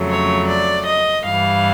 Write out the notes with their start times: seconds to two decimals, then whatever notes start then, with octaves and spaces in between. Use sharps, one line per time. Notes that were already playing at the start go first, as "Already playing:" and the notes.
Already playing: F2 C#3 F#3 A3
0.09 C#5
0.48 D5
0.86 D#5
1.24 G2 E3 G3 F5